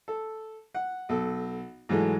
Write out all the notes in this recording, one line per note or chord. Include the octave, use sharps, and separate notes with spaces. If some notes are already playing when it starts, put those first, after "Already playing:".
A4
F#5
B1 A4
G#2 E3 F#3 G#3 A3